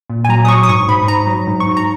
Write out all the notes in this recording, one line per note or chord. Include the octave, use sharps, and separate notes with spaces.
A#2
G#5
F#3 A#5
D#6
F#3 C#6
D#6
G#2 C#6
G#2 B5
G#2 A#5
F#3
G#2
C#6
G#2
A#5